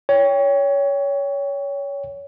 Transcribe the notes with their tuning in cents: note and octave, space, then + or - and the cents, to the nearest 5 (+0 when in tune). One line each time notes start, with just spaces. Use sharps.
C#5 +20 G5 +15